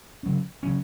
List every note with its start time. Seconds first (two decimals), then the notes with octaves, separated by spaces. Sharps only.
0.23 C#3 F#3 C#4
0.63 C#3 F#3 C#4